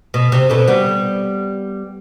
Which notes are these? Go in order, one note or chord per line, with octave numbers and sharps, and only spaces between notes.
B2
C3
B2 D3
G3 B3